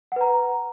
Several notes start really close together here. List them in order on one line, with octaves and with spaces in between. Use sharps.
F#5 B4 A#5